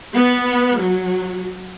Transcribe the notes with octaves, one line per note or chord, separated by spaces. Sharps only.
B3
F#3